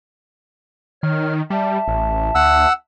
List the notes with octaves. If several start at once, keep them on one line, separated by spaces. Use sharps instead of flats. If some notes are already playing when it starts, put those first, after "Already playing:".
D#3 C#5 F6
G3 E5 A5
A1
D2 F#5 E6